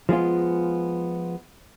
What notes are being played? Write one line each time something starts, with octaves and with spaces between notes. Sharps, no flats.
F3 G#3 B3 F4